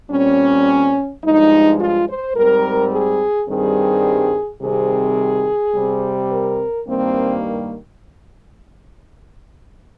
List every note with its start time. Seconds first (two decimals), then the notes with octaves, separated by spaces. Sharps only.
0.10 A#2 G3 C4 C#4
1.23 G2 F3 G#3 D#4
1.79 F4
2.08 C5
2.35 G#2 G3 C4 A#4
2.92 G#4
3.48 G2 D#3 G3 C4 G#4
4.61 C3 D#3 G3 C4 G#4
5.74 C3 G3 C4
6.30 A#4
6.86 G2 D#3 G3 A#3 C4